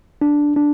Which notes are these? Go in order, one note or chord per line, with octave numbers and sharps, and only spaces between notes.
D4
D4